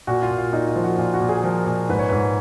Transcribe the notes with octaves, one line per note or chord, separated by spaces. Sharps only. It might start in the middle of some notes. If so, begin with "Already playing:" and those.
A#2 F#4
F4
A#2
F4
A#2 D#4
F4
F3
F#4
A#2 F4
F#4
A#2
G#4
F3 A#4
A#2
G#2 B4
C#5
G#2 B4